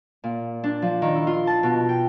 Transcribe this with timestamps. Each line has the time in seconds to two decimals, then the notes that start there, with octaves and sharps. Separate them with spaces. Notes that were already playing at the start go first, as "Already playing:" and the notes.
0.24 A#2
0.64 D4
0.82 F3
1.02 D#3
1.15 E4
1.27 F4
1.47 A5
1.63 B2
1.89 G5